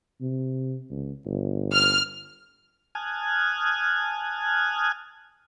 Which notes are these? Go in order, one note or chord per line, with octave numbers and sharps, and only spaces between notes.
C3
C#2
G1
F6
G#5 A5 D#6 F6 F#6 G#6